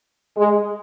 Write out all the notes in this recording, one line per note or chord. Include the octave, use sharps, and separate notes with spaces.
G#3